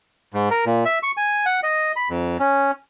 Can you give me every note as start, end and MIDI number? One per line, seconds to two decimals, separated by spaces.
0.34 0.49 44
0.51 0.65 70
0.66 0.84 46
0.85 0.99 76
1.03 1.11 85
1.17 1.45 80
1.46 1.60 78
1.63 1.92 75
1.96 2.09 83
2.10 2.37 41
2.40 2.71 61